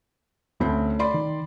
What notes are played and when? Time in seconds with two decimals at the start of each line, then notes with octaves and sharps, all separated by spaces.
0.60 D2 A3 C4 C#4 B5
0.99 D5 B5 C6
1.14 D#3